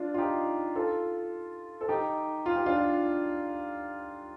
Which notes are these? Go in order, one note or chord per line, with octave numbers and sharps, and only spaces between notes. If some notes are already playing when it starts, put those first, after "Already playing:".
Already playing: D4 F4
F4
D#4 G4
F4 A4
A4
D#4 G4
F4
G4
D4 F4